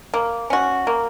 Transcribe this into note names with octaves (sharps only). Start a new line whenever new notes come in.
A#3
C#4 F#4
A#3